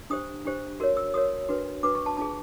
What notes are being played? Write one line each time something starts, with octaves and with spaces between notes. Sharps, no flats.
D4 G4 C5 D#6
D4 G4 C5
F#4 A#4 C#5
E6
F#4 A#4 C#5 D#6
D4 F#4 B4
D4 F#4 B4 D6
C#6
A5
D4 F4 G#4 A5